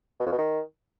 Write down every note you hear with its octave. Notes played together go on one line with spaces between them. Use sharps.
B2
F2
B2
D#3